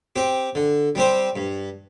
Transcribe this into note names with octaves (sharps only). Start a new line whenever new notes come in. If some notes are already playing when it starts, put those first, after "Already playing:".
C4 G4
D3
G3 C4 G4 C5
G2